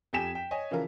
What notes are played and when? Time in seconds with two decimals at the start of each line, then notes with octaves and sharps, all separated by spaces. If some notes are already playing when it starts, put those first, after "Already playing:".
0.13 F2 G4 G5 G#5 B6 E7
0.35 G5
0.51 C#5 D#5 G#5
0.71 C#3 E3 F3 F4 A#4